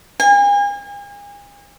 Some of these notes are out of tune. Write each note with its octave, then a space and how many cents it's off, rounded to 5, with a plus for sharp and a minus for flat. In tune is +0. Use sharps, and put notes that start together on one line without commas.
G#5 -40